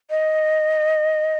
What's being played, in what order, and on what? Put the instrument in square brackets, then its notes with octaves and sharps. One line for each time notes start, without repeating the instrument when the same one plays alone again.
[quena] D#5